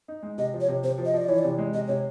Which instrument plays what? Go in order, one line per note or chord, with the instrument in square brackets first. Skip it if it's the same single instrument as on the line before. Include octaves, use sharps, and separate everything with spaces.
[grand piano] D#4
G#3
[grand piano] C3 [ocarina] D#5
[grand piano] F3
[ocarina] C#5
[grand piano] C3
[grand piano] C3 [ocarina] C5
[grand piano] F3
[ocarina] D#5
[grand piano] F3 [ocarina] D5
[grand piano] E3 [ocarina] C#5
[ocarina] D5
[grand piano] C3
G#3
[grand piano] C3 [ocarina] D#5
[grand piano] C3 [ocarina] C#5